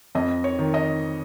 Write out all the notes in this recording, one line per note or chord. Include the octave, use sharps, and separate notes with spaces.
F2 D#5
C#5
D#3
D#5